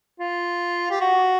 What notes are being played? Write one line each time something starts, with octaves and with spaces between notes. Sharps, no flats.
F4
G4
F#4